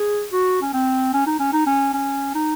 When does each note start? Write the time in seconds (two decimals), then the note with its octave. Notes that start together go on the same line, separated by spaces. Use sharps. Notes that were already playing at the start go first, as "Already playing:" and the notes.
Already playing: G#4
0.32 F#4
0.61 C#4
0.73 C4
1.13 C#4
1.26 D#4
1.39 C#4
1.53 D#4
1.66 C#4
1.93 C#4
2.34 D#4